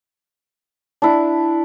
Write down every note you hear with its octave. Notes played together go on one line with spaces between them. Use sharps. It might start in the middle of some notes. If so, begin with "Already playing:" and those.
D4 E4